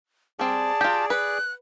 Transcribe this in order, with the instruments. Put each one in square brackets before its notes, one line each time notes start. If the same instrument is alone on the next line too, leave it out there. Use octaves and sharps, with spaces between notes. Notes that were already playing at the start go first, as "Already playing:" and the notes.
[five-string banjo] G3 C4 [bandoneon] G#4 D5 [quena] A5
[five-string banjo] F4 G4
[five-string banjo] B4 [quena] F#6